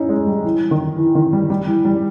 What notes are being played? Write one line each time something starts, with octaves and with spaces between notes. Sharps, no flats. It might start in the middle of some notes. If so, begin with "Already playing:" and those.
Already playing: C#4 D#4 E4
G#3
G3
E3
D#3
E3
D#3
G3
G3
E3
G3